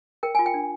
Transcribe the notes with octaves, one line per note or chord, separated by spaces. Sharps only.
A#4 G5
F4 G#5
G5
D4